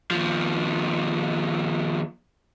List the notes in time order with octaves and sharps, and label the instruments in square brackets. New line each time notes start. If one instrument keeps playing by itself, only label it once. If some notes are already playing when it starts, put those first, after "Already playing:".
[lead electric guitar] D#2 F3